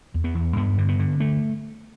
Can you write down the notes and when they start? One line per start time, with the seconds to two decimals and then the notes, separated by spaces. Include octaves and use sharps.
0.14 E2
0.24 B3
0.35 E2
0.56 G2 B3
0.78 D3
0.89 B3
0.99 D3
1.20 A3